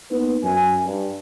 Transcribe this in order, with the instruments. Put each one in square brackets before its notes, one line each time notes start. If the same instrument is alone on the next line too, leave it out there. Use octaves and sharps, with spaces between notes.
[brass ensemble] A#3 B3 D#4 B4
F#2 G#5
G2